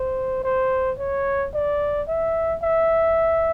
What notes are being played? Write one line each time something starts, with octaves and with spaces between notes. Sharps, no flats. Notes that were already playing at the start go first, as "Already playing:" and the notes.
Already playing: C5
C5
C#5
D5
E5
E5